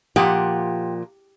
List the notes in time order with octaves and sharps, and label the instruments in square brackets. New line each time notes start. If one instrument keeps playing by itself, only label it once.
[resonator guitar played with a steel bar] A#2 F3 F#5 [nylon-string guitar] G4